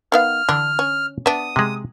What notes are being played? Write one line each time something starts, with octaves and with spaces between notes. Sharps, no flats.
D#3 B3 F5 F6
D3 E3 D4
C#4
B3 D4 E5 D#6
C3 G#3